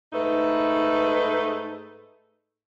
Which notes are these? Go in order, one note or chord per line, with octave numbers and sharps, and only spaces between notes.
G#2 A3 D#4 B4